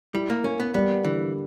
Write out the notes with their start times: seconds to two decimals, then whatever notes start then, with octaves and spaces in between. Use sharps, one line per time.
0.14 G3 E4
0.30 A#3
0.44 A#3 C#4
0.60 B3
0.74 G3 B3
1.04 D3 E3